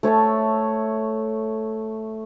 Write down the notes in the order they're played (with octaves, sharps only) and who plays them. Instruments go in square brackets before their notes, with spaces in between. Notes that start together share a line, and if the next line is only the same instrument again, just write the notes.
[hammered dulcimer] A3 C#5 E5 A5